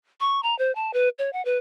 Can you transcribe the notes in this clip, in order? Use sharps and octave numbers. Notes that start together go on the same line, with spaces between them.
C#6
A#5
C5
A5
B4
C#5
F#5
B4